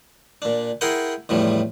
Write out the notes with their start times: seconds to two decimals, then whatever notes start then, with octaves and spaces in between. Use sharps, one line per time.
0.42 A#2 D4
0.81 E4 G#4 A#4 F#5 G5 C6
1.29 E2 A2 F3 G3